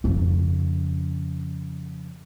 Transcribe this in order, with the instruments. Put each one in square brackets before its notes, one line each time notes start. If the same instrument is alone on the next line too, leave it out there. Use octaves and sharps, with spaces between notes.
[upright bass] F2 C#3